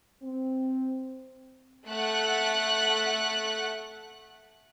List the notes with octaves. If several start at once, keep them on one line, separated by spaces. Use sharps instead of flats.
C4
A3 F#5 F#6